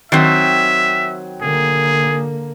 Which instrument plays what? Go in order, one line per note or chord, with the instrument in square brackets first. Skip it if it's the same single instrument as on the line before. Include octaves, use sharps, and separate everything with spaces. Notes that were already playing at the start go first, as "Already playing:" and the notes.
[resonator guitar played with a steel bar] D#3 F#3 C4 [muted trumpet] E5
[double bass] D3 A#3 [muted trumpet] G#4